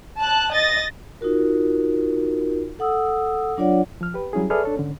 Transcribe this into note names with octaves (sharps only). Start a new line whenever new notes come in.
A5 F#6
D#5 A6 A#6
D#4 F4 F#4 A#4
A4 F#5 D#6 E6
F#3 D4 F4 C#5 D5 F#5
F3 F6
G4 B4
F#3 G3 C#4 E4 G#4
G#4 A4 B4 D5 E5 F6
D4 A4 C#5
G#2 D3 C#4